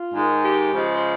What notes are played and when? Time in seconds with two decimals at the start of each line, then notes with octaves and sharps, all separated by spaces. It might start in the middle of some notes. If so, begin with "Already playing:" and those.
Already playing: F4
0.14 G#2 D#3 G#3
0.43 G4
0.73 C#3 F3 G#3
0.94 C5